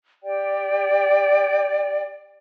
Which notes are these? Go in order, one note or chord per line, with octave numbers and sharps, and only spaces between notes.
G4 D5 G5